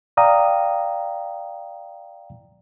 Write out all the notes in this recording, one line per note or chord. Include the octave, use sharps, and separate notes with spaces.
D5 F5 G5 A#5 D#6